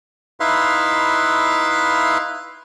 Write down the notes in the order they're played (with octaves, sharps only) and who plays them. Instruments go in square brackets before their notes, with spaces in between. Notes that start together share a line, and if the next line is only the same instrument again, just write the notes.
[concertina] D#4 E4 B4 E5 F5 C6